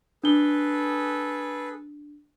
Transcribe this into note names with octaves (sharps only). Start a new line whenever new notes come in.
D4 G#4 A4 B4 G7